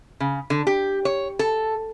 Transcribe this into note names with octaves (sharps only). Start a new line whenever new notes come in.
C#3
D3
G4
C#5
A4